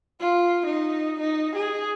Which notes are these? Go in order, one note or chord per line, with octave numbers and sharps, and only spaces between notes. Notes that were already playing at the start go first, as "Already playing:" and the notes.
F4
D#4
D#4
G#4